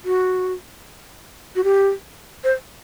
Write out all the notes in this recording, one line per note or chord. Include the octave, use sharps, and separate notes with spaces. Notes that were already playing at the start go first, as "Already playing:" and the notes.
F#4
F#4
G4
C5